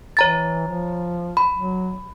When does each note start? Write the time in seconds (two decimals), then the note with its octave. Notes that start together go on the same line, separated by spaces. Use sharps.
0.17 E3 C#5 A#5 A6
0.68 F3
1.37 B5
1.55 F#3